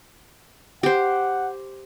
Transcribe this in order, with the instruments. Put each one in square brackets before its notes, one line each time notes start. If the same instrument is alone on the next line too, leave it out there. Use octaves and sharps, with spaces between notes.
[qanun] G4 C5 [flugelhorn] F#5